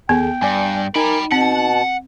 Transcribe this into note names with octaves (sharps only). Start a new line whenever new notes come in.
D#2 B3 G#4 A4 G5
G2 D5 G#5
D#4 A#4 G5 G#5 B5
B2 C4 F#5 A5